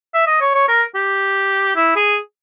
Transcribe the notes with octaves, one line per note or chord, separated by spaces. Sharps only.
E5
D#5
C#5
C#5
A#4
G4
E4
G#4